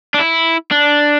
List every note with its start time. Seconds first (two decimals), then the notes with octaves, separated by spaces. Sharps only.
0.14 D4
0.19 E4
0.71 D4